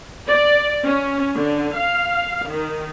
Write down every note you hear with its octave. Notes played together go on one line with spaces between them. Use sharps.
D5
C#4
D3
F5
D#3